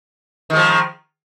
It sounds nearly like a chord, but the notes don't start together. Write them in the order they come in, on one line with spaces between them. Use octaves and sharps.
D#3 G#3 F3